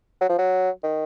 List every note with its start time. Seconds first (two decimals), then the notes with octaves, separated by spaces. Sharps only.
0.21 F#3
0.29 F3
0.38 F#3
0.84 D#3